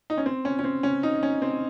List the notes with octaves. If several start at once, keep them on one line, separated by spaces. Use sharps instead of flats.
D#4
C#4
C4
C#4
C#4
C4
C#4
D#4
C#4
C4